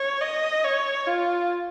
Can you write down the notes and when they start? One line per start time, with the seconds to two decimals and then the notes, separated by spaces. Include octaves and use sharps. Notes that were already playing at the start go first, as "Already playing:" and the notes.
Already playing: C#5
0.21 D#5
0.64 C#5
1.07 F4